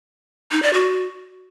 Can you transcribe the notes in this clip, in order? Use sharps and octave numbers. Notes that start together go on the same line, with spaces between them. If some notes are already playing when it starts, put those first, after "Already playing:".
D#4
D5
F#4